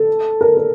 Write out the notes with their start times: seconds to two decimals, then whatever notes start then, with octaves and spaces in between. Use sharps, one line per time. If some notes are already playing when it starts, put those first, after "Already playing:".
Already playing: A4
0.41 A#4
0.57 A#4